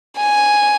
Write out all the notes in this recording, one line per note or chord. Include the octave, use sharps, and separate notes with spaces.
G#5